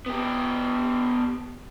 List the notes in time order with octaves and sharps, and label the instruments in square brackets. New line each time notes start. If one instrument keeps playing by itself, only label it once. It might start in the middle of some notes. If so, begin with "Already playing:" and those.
[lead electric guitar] B3 G4